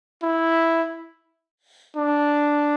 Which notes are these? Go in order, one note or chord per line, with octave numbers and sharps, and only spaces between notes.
E4
D4